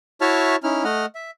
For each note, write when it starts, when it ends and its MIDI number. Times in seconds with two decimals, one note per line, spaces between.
0.21 0.56 64
0.21 0.56 66
0.21 0.56 73
0.21 0.56 76
0.21 0.56 81
0.21 0.56 89
0.63 0.84 61
0.63 0.84 63
0.63 0.84 64
0.63 0.84 89
0.84 1.06 57
0.84 1.06 75
0.84 1.06 78
0.84 1.06 89
1.15 1.31 76